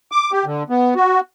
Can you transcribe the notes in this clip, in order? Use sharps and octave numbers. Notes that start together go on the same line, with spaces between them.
D6
G4
D3
B3
F#4